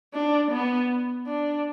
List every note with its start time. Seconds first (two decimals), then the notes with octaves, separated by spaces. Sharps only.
0.14 D4
0.51 B3
1.27 D4